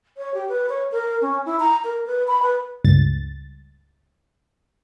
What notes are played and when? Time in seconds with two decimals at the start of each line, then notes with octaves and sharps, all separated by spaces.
0.17 C#5
0.34 G4
0.49 B4
0.69 C#5
0.92 A#4
1.21 C#4
1.46 E4
1.60 A#5
1.84 A#4
2.06 B4
2.28 B5
2.43 B4
2.85 C#2 G2 A6